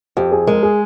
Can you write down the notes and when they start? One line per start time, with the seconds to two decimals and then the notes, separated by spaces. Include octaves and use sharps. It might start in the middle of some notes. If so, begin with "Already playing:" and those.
0.17 F2 G4
0.32 G#4
0.47 G#3 A#4
0.63 G#4